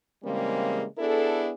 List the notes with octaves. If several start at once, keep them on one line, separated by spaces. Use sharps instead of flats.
C#3 E3 G3 G#3 A#3 C4
B3 D4 E4 G#4 A4